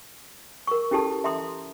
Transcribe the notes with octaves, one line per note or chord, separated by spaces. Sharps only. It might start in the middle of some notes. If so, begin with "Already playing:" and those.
A#4 C#6
C#4 E4 G4 A4 A5
E5 A#5 C6 D#6